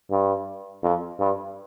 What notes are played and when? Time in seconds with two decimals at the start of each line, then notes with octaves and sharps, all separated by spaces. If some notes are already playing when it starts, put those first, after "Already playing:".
0.11 G2
0.83 F2
1.20 G2